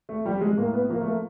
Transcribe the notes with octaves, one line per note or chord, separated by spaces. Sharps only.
A3
F3 G3
G#3
A2 A#3
B3
F3 A#3
A3
A#3